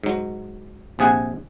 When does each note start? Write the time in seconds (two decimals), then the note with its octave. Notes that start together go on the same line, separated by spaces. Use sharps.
0.04 G#2 F#3
0.99 A#1 C3 G#4 F#5 G#5